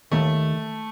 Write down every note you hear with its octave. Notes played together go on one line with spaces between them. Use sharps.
D#2 A3